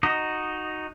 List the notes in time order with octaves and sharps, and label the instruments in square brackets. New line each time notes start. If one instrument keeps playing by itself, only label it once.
[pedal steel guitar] D#4 F#4 D#5